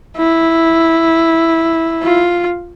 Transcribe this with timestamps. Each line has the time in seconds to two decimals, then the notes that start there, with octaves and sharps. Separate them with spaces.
0.17 E4
2.03 F4